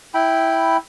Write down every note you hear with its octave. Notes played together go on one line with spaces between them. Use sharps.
E4 G5 B5